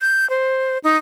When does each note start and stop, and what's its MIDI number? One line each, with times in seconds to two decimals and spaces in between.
0.01 0.28 91
0.30 0.78 72
0.84 0.97 63